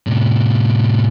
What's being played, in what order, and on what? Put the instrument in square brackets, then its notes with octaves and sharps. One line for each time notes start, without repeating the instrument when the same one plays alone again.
[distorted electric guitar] A2 C3